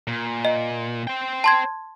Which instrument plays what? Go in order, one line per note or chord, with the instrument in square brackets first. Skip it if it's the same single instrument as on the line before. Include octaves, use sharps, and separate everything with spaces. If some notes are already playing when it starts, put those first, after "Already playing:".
[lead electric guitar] A#2
[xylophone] D#5
[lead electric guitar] C5 G5
[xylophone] A5 C6 G#6